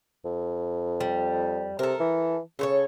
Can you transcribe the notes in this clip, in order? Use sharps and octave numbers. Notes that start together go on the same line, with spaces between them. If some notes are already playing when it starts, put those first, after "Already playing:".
F2
G3
C3 A4 A#4
E3
C#3 A4 C5 C#5